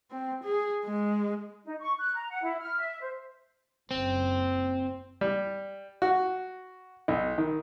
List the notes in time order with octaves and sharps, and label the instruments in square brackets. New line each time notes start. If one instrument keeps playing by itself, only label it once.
[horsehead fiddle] C4
G#4
G#3
[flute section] D#4
C#6
F#6
A#5
F#5
E4
F6
E5
C5
[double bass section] F#1 [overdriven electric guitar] C4
[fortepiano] G3
F#4
B1
D#3